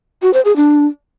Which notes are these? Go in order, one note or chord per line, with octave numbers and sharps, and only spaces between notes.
F#4
C5
G#4
D4